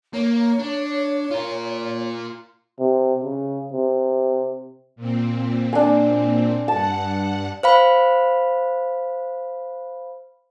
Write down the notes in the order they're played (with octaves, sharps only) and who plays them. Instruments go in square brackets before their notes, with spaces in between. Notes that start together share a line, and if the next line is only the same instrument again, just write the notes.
[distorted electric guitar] A#3 [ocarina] C#5
[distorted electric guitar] D4
F4 A#4
[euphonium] C3
C#3
C3
[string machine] A#2 C4
[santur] D4 G#5
[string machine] G2 F#5 [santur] A5
[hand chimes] C5 F5 B5